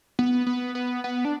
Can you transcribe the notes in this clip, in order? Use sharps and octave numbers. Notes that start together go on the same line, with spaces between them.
B3
B3
B3
B3
D4